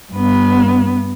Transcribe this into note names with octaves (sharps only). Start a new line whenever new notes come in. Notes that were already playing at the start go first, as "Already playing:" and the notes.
G2 B3